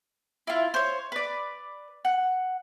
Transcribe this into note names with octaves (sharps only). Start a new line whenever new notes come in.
E4 F4
C5 C#5
B4 D5
F#5